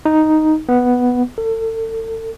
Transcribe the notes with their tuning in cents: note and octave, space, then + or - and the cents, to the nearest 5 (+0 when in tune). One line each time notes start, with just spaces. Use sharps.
D#4 +0
B3 +0
A4 +35